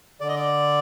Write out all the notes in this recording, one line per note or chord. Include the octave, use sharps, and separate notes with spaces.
D3 D5
D#5
D5